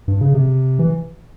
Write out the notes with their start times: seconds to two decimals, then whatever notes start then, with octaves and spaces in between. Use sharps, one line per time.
0.08 G2
0.21 C#3
0.34 C3
0.79 E3